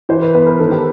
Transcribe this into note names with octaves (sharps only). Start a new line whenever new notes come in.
E3 C5
B4
B3 B4
A#4
D#3 A4
G4